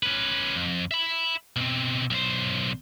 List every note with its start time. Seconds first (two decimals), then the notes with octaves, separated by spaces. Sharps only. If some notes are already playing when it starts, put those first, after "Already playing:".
0.03 C#4 B4
0.55 F2
0.91 E5 B5
1.56 B2 C4
2.10 B1 C5